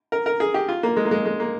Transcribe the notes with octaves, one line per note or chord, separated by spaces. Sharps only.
A#4
A#4
G#4
G4
F4
A#3
G#3
A#3
G#3
G#3
A#3